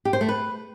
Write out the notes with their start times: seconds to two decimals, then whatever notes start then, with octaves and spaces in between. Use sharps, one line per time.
0.05 G4
0.13 C5
0.21 A3
0.29 B4